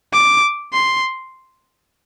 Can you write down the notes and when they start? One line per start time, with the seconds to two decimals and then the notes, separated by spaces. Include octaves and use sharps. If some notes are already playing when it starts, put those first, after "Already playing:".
0.13 D6
0.73 C6